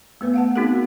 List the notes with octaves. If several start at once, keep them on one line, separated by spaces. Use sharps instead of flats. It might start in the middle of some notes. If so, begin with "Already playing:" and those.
A3 B3 B4
F5 F#5 A5
B3 C4 D#4 F#4 G#4 A#4